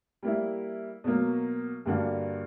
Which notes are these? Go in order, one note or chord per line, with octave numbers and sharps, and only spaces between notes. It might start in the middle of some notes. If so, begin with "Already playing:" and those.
G3 A#3 E4
B2 F#3 A#3
G2 D3 A#3 D4 F#4